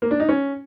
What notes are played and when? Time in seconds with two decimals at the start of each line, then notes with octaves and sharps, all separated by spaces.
0.02 A#3
0.11 D4
0.20 D#4
0.29 C#4